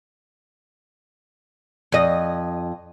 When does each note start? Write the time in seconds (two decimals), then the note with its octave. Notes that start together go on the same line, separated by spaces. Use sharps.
1.92 F2 D#5